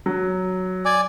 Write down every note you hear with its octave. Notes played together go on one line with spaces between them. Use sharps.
F#3
D5 G#5 D6